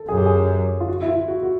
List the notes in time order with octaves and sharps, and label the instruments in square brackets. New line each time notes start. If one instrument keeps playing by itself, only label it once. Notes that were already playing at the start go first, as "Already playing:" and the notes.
Already playing: [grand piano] A4
[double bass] F#2 [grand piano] G#4
[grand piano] G4
G#4
F4
F#4
E4
F4
F#4
F#4